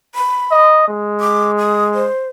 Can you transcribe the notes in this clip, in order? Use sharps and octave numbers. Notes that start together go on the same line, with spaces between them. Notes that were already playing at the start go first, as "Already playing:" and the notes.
B5
D#5
G#3
D6
D#6
C5